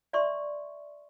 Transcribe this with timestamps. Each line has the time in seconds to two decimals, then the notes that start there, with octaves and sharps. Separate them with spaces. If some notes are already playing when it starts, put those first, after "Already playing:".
0.13 D5 E5 C6 C#6